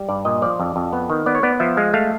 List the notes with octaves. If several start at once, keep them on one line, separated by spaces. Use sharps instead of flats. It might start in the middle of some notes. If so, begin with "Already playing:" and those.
Already playing: G3
G2 D5
A#2 D#5
F3 D5
F2
F2
B3
D#3
B3 D5
C#5
B3 D5
F3 E5
G#3 F5
A3 F5